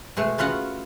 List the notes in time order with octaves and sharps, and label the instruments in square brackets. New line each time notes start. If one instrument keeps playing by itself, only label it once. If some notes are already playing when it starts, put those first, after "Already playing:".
[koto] B2 G#3 A3
B3 C#4 F4 F#4 F#5